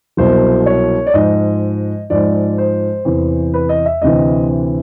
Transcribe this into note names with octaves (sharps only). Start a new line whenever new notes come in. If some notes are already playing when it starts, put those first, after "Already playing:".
C2 B2 F#3 C5
C#5
D5
G#2 F3 D#5
G#2 F3 D5
C5
E2 C3 E3
B4
D#5
E5
D2 C3 E3 D#5